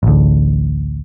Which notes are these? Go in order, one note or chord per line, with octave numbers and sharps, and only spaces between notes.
A1 D2